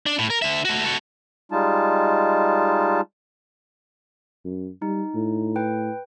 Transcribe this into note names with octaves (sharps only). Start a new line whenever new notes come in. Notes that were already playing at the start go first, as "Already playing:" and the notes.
D4
A2
A#4
D3 E5
A3 F#4
F#4 A4
G3 G#3 D#4 F4 A5
F#2
G3 D#4
A2
B4 G5